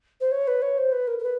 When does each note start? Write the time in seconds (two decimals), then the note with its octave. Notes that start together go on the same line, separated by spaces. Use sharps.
0.21 C5
0.31 C#5
0.47 B4
0.62 C#5
0.78 C5
0.92 B4
1.07 A#4
1.19 A#4
1.23 B4